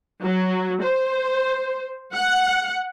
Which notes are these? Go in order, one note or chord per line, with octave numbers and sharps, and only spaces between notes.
F#3
C5
F#5